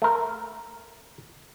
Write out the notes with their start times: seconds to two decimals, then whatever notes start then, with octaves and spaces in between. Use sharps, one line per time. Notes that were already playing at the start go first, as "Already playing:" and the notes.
0.02 A3 A#4